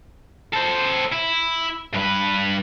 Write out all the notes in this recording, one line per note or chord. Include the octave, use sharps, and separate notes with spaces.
A4 C5
E4
G2 B4